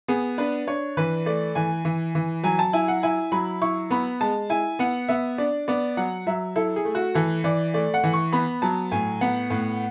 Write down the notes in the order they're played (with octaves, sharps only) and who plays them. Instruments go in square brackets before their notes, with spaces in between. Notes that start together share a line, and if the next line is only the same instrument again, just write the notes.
[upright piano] B3 G#4
D4 B4
D4 C#5
E3 B4
A3 D5
E3 G#5
E3
E3
F#3 G#5
A5
E4 G#5
F#5
E4 G#5
F#3 B5
E4 C#6
B3 B5
G#3 A5
E4 G#5
B3 F#5
B3 E5
D4 D5
B3 D5
F#3 F#5
F#3 E5
E4 A4
G#4
A3
F#4
E3 A4
E3 D5
A3 D5
F#5
E3
C#6
B3 B5
F#3 A5
A2 G#5
B3 F#5
A2